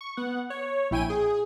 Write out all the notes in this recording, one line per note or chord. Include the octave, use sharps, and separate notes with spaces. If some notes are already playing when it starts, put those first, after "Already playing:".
C#6
B3 F#5
C#5
A#1 E4 G5 G#5 D#7
G#4